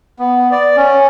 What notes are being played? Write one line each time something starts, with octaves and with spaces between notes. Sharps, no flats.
B3
D5
C#4